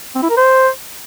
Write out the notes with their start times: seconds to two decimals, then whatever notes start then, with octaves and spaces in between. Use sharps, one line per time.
0.15 C4
0.23 E4
0.30 A#4
0.37 C5